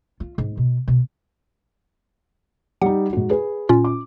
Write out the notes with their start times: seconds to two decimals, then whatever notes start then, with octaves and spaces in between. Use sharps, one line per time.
0.20 F4
0.38 G#2
0.57 B2
0.88 B2
2.82 G3 D#4 F#5
3.13 G#2 F#4
3.30 G#4 B4
3.69 A#2 C#4 F4
3.84 D6